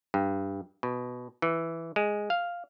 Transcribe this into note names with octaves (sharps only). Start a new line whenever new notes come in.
G2
B2
E3
G#3
F5